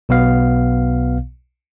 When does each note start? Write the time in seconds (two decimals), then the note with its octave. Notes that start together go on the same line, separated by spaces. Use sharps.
0.09 B1 B2 B3 F5